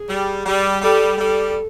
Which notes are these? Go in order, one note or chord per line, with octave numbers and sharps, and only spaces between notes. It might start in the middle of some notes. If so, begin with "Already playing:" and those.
Already playing: G#4
G3
G3
G3 A4
G3 A4